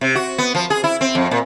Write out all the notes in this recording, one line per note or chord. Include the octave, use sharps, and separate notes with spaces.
C3
F#4
B3
F3
G#4
E4
C4
F2
A#2